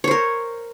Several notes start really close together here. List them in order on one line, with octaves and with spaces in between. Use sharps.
C#5 C5 A#4